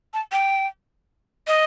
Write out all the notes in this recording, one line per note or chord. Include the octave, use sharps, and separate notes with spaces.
A5
G5
D#5